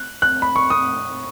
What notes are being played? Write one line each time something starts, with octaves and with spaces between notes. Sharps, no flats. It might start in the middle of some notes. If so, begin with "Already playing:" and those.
Already playing: F#6
F#6
B5
C#6
D#6